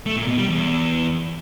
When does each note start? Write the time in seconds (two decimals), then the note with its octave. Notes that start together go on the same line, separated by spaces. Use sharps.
0.06 A3
0.17 A#2
0.27 B2
0.38 G3
0.48 E2